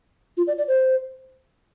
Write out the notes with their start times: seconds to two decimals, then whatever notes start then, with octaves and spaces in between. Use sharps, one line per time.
0.37 F4
0.47 D5
0.58 D5
0.68 C5